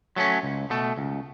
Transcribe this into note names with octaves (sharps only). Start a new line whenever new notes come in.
F#3 A3 C#4
C#2
B2 A3
C#2